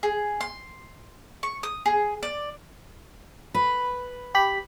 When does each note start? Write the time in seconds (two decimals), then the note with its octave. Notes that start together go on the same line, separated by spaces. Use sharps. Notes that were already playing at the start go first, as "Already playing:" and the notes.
0.03 G#4
0.41 C6
1.43 C#6
1.63 D#6
1.86 G#4
2.23 D5
3.54 B4
4.35 G4 B5